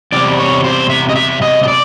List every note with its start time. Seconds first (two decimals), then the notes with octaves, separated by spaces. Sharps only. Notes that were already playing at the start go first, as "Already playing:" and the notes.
0.12 E2 C3 G3 D5
0.39 C#5
0.64 C5
0.90 E5
1.09 D#5
1.15 E5
1.42 D#5
1.63 D#5
1.68 D5